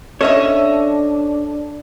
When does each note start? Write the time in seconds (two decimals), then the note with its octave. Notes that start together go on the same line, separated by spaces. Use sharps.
0.21 C#4 D4 A4 C#5 D#5 E5